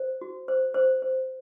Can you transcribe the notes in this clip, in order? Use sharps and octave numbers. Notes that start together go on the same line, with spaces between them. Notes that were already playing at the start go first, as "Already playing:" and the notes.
Already playing: C5
F#4
C5
C5
C5